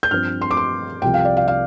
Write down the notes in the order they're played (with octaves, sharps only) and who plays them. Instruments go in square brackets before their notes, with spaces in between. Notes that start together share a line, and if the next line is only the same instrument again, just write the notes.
[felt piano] G6
G2 F3 C4 F6
C6
D6
C6
C2 C3 F3 G5
F5
D5
F5
F5